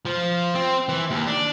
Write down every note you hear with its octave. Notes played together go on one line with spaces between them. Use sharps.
F3
C4
E3
D#2
D4